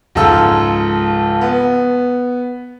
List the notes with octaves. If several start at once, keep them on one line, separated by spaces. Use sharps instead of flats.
C#2 G#2 F3 A4 E6
B3